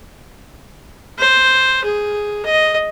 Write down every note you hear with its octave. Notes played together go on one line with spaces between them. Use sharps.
C5
G#4
D#5